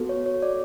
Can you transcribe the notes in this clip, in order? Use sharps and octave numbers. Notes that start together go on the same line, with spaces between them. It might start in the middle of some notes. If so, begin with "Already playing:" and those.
Already playing: B3 F#4 A4
C#5
C#5
D5